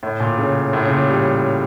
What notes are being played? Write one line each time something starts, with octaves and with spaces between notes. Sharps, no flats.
A2
A#2
C#3
A2
C#3
A#2
G3